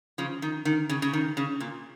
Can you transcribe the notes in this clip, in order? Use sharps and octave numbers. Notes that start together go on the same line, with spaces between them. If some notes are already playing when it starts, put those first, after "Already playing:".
C#3 F3
D#3
D#3
C#3
C#3
D#3
C#3
A#2